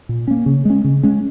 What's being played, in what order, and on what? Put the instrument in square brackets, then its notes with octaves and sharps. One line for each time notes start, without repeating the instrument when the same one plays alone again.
[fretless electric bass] A#2
A#3 C#4
C#3
G#3 C#4
C#3
G#3 C#4